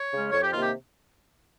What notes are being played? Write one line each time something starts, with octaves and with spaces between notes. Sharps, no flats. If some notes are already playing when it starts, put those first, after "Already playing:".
Already playing: C#5
C#3 G#3 C#4
F2 C#5
G4
C3 D#3 A#3 F4
G4